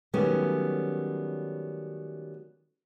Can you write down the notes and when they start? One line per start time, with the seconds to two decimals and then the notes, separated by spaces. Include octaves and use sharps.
0.14 D#3 F#3 G3 A3 B3 C#4